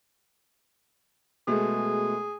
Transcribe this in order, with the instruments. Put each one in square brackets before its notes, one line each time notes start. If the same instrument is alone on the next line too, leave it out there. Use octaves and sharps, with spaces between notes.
[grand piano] B2 G#3 A3 [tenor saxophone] G#4